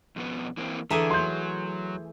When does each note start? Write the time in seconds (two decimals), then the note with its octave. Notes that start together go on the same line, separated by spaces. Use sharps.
0.16 F2 B2 B3
0.57 E3 A#3 C4
0.91 D3 E3 A3 G#4 A#5
1.10 F#3 C6 G6